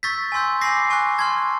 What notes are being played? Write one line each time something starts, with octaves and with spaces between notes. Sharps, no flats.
C#6 E6 G6 A6 B6
G#5 C6 E6 G6
G#5 B5 D6 A#6 C7
G#5 C#6 F#6
A5 C6 F6 G#6